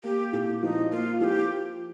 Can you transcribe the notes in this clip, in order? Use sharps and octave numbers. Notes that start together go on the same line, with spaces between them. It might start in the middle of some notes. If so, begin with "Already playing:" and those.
A#3 G4
A#2 G4 A4
F3 D#4
A#3 F4
F3 G4 A4